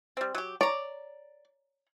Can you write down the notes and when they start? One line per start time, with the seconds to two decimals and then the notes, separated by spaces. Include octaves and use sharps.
0.17 G3 C4
0.35 F#3 G4
0.61 C#5 D5 A#5